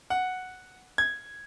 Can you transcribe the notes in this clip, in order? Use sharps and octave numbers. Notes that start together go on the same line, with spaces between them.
F#5
G#6